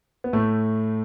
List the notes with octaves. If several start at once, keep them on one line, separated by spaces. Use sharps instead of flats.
B3
A2 A3